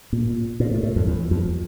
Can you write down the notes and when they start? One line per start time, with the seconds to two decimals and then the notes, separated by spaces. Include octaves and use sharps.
0.13 A#2
0.60 A#2
0.71 A2
0.83 A2
0.96 F2
1.07 E2
1.31 F2